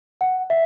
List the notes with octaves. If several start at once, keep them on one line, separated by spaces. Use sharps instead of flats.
F#5
E5